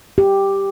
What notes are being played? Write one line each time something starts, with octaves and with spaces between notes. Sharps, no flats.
G4